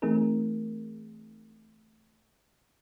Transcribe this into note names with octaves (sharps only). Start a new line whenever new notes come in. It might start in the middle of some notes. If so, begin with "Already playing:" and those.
E3 A3 C4 D#4 G#4 A#4